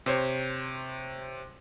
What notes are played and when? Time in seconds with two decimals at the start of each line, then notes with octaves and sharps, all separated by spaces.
0.06 C3 C5 C#5